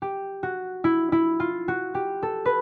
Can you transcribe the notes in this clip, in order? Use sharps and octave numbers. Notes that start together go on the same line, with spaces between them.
G4
F#4
E4
E4
F4
F#4
G4
A4
B4